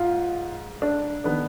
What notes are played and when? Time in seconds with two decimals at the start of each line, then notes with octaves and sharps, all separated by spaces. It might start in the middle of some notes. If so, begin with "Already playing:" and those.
Already playing: G#2 F4
0.82 D4
1.24 D#3 B3 D4